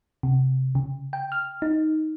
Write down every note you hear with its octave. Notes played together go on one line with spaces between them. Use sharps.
C3
C#3
G5
F6
D#4